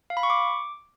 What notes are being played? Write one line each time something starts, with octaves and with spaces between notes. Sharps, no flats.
F5
B5
C#6
D6